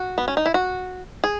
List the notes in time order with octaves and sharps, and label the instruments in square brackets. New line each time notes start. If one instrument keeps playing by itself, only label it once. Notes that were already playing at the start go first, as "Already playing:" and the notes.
Already playing: [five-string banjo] F#4
B3
C#4
D#4
E4
F#4
G#4